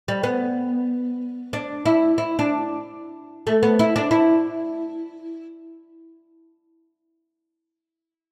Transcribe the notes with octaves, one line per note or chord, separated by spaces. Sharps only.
G3
B3
D4
E4
E4
D4
A3
B3
E4
D4
E4